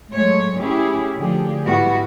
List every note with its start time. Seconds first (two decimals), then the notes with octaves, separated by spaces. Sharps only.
0.11 F#3 G#3 A3 C#5
0.59 A3 C#4 E4 G4 G#4
1.18 D3 F3 A3 G4 G#4
1.65 G#2 G3 B3 E4 F#4